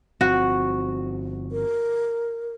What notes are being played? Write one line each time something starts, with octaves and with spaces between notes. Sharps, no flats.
G1 F3 C4 F#4
A#4